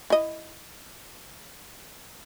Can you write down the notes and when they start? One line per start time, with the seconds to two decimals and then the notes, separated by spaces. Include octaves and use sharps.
0.10 E4 D#5